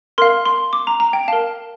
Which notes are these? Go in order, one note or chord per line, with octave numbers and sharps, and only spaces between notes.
A#4 F5 C6
C6
D6
A#5
A#5
G5
A#4 F5 A5